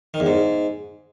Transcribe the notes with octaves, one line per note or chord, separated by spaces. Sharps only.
D#3
E2
G#2